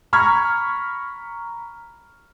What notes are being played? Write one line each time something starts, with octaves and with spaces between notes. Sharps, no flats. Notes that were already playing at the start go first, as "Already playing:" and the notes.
A#5 B5 C#6 F6 G#6